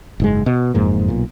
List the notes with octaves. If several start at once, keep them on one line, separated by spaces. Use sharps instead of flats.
F#1 G#2 G#3
B2
F#1 F2 G#2 A#3
B1 A#2